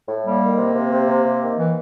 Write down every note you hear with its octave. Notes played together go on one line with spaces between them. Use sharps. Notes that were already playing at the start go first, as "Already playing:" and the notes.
A2
G3 A#3
D#3
C3
C3
C3
C3
C3
D#3
E3